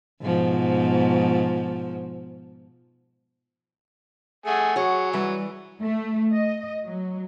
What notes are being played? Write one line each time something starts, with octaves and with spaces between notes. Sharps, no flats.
G#2 B2 F3
A3 G#4 F#5
F#3 G#4 C#5
E3 G3 B4
A3
D#5
F#3